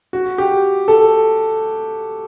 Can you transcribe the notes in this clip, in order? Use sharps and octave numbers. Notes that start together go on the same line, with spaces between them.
F#4
G4
A4